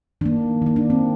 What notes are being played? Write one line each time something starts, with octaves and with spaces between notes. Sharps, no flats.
D#3 A#3 D4
D#3 A#3
D4
C4